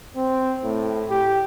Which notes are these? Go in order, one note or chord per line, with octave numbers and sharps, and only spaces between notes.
C4
A2
G4